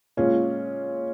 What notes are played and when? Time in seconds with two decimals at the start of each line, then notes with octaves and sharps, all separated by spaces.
0.17 A#2 G#3 C#4 F4